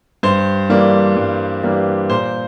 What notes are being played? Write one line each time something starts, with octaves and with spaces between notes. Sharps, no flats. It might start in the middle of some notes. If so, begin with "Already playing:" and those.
G2 C5
E3 G3 A#3 D4
G2
E3 G3 A#3 D4
A#2 C5